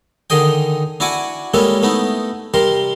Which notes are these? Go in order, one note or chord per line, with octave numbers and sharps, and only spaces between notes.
D3 D#3 G#4 D#5 G5
D4 E4 F#4 F#5 G#5 D6
G3 G#3 A#3 C#4 E4 A4
A3 B3 D#4 E4
C3 G3 A#4 C6